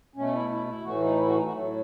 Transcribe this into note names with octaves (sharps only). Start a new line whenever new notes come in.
B2 A3 C#4
E4
E4
E4
A2 E3 A3 F#4
D#4
E4
F#4
D#4
F#4
A2 F#3 A3